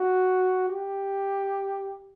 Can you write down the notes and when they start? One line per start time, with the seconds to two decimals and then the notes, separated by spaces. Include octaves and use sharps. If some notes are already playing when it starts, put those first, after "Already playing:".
Already playing: F#4
0.69 G4